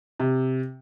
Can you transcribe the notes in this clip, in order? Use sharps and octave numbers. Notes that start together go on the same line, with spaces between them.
C3